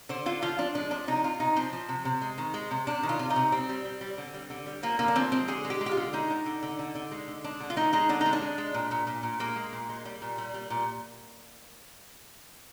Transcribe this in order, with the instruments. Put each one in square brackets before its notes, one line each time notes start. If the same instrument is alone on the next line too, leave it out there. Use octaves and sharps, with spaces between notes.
[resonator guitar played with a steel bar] D3 C5
D3 F4
F3 F4
F3 D4
G#3 D4
F3 D4
C3 D#4
C3 F4
C3 D#4
F3 C4
F3
C3
C3
G#3
D#3
G#3
C3
C3 D4
D#3
F4
C3
D#4
C3
G3 C4
G3
G3
G3
D3
G3
D3
G3
F3 A#3
D3 A#3
D4
F3 C4
G#3 C4
D3 G#4
G#3
G4
G#3
G4
F4
D3
G#3 D#4
D3
D3
D3
D3
D3
G#3
D3
G#3 D4
D3
F4
G#3 D#4
G#3 D#4
D3 D4
D#4
G#3
D4
G#3
G#3
A#2
A#2
A#2
A#2
G#3 A#3
G#3
A#2
G#3
G3
A#2
G3
G3
A#2